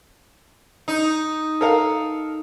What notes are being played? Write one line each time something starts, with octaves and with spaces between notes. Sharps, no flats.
D#4
A4 A#4 F5